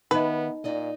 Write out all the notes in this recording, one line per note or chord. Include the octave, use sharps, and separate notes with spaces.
D#3 B3 D#4 B4 D#5 E5
A#2 D#4 D5 D#5